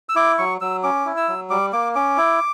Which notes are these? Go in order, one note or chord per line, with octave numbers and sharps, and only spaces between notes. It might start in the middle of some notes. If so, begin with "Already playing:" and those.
E6
E4 D6
F#3 C#6
F#3 E6
C#4 D6
E4
E6
F#3
G3 D6
A#3 D6
C#4 D6
E4